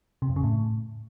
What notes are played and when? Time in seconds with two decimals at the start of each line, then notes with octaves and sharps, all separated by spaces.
0.22 C3
0.29 F2
0.36 C#3
0.43 A2